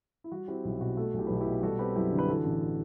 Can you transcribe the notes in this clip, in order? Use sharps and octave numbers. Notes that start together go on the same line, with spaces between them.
E4
G3 F#4
C4 E4 G4
B1 E4
B2 F#4
A3 F#4 A4
B1
E4 G4
B4
B1 A4
E4 G4
B2
G3 F#4 A4
C4 G4 B4
F#2 E4 G4
D3
B4
E3 F#4 A4
A1